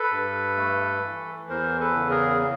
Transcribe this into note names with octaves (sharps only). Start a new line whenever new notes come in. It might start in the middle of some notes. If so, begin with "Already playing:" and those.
Already playing: A4 B4
G2
A3
E3
E2 A#4 C5
A4 B4
C#3
G#4 A#4